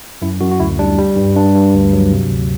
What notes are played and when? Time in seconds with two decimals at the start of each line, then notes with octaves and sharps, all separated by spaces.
0.22 F#2 E4
0.41 F#2 F#4
0.51 F#4
0.60 D2 E4
0.79 G3 D4
0.98 G3
1.16 G2
1.36 G2 D4
1.55 G2
1.74 D2
1.93 F#3
2.12 C3
2.31 D2